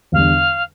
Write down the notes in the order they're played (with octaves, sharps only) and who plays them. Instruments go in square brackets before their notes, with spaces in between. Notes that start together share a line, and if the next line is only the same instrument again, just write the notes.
[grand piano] E2 D3 G3 D4 [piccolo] F5